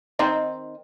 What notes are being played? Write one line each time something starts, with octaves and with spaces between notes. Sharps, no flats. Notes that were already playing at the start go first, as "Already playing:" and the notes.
D#3 C4 D#4